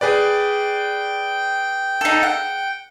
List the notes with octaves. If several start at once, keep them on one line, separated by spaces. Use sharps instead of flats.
G#4 B4 D5 G5
D#4 A4
F#5